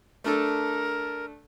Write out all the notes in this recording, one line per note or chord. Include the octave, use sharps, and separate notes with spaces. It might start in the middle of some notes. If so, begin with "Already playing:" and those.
A3 D4 A4 A#4